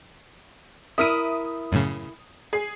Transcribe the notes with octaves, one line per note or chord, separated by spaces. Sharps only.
E4 A#4 E5 D#6 D#7
F#2 A2 C#3
G#4 C7